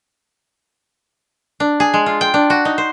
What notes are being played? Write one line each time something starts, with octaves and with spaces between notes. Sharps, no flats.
D4
G#4
G#3
F4
G5
D4
F#4
D#4
C5